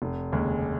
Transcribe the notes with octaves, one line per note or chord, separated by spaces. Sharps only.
F1
D#2 C#3 G#3